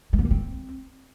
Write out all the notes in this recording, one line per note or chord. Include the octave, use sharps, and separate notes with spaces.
G#3
B3
A#3
C4